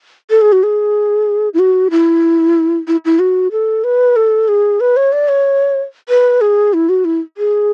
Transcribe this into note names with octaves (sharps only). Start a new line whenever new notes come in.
A4
G#4
F#4
G#4
E4
F#4
E4
E4
E4
F#4
A4
B4
A4
G#4
B4
C#5
D5
C#5
B4
G#4
E4
F#4
E4
G#4